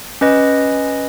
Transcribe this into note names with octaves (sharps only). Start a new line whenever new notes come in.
C#4 B4 D#5